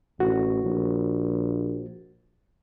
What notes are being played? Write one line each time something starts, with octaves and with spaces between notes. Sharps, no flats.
A1 F#4
A#1